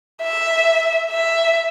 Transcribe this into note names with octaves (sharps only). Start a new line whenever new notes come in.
E5
E5